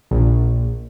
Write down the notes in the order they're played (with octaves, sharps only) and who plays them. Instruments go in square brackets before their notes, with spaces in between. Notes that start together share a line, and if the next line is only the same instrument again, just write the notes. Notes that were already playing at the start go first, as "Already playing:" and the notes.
[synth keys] A#1